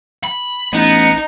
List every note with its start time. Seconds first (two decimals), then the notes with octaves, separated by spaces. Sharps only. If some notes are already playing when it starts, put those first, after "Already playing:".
0.24 B5
0.73 A1 B3 D#4